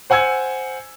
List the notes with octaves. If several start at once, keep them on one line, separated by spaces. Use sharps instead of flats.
C5 F#5 G#5 E6 G#6